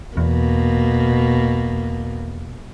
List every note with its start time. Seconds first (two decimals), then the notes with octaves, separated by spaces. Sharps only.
0.17 E2 B2 A#3